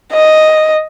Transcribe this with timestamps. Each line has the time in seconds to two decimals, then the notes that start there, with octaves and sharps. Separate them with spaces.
0.13 D#5